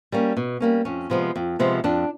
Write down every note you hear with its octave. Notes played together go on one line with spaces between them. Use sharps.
G3 A#3 C#4
B2
G3 A#3 C#4
F2 C#4
C3 F3 G#3 B3
F2
C3 F3 G#3 B3
F2 D4